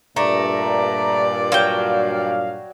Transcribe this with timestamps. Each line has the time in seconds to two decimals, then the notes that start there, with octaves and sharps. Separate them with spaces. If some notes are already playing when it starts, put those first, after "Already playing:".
0.16 G2 A#2 A3 D5 A#5
1.52 F#3 F5 G5